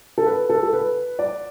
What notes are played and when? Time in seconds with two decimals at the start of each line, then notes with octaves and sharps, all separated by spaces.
0.18 A4
0.26 B4
0.49 A4
0.63 A4
0.73 B4
1.19 D5